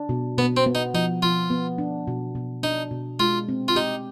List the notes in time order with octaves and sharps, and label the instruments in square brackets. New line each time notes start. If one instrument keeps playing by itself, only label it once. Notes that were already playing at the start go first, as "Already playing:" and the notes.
Already playing: [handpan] D4
B2
[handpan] B2 [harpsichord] B3
[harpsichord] C4
[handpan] B3
[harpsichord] D#4
[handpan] F3 [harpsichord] D#4
[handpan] F3 [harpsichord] F4
[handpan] B3
D4
B2
B2
[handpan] D4 [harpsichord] D#4
[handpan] B2
[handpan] G#3 [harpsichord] F4
[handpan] C4
[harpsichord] F4
[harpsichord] D#4 [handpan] G4